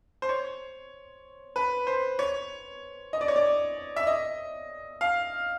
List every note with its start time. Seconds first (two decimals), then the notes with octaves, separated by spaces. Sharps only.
0.22 C5
0.29 C#5
1.56 B4
1.87 C5
2.19 C#5
3.13 D#5
3.21 D5
3.28 C#5
3.36 D5
3.96 E5
4.07 D#5
5.01 F5